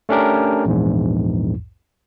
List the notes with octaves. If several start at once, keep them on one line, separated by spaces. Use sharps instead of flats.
A3 C#4 D4 G4 A#4
A#1 E2 G#2